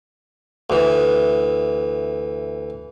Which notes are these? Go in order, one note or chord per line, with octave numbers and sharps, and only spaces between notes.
D2 E3